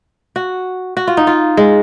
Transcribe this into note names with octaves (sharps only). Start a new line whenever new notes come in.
F#4
F#4
F4
D#4
F4
G#3